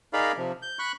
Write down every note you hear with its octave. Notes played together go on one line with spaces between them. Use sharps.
D#4 G#4 A#4 D5 F5 B5
C3 F3
G6
B5 C#6 F#6